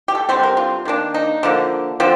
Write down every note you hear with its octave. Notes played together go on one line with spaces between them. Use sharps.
G4
A4
D3 G3 C4 C5
A#4
F4
D#3 A#3 D4
D#4
D3 F3 A#3
D3 F3 C4